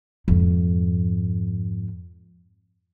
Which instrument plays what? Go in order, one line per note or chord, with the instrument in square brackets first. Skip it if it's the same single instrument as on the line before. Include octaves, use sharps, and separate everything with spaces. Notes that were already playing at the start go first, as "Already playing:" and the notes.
[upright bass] F2 G#2